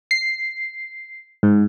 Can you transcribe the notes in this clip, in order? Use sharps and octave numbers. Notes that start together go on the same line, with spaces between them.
C7
G#2